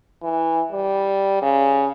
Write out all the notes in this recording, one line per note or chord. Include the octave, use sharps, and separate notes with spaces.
E3
G3
C#3